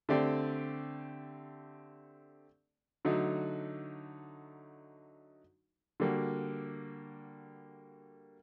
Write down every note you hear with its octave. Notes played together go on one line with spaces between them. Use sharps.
D3 A3 C4 G4 D5
D3 F#3 A3 D#4 F#4
D3 G3 A#3 F#4